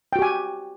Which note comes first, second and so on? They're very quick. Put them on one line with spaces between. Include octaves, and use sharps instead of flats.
G5 F#4 G4 G#5